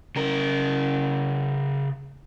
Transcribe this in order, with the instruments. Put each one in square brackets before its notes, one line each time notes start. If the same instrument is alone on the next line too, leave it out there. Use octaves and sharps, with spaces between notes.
[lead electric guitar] C#3 A#4